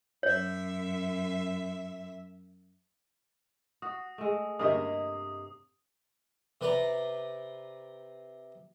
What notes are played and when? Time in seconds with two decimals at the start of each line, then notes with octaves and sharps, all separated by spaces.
0.23 F#2 C#5 E5
3.82 F#4 D#6
4.18 G#3 A3
4.59 G2 C3 A#3 C#5 D#5 E5 D#6
6.61 C3 B4 D5 A#5